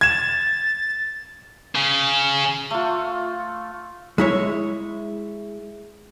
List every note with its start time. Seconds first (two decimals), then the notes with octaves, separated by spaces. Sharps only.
0.01 G#6 A6 E7
1.75 C#3
2.70 A3 F4
4.18 G#3 E4 C#5